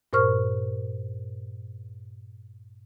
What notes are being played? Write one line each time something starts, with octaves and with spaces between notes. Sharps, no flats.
G2 A#2 A#4 C5 C#6 F6